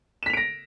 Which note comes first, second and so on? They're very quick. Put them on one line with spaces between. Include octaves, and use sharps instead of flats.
E7 B6 F7 D7 A#6